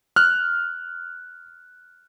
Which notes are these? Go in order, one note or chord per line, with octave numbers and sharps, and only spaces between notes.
F6 F#6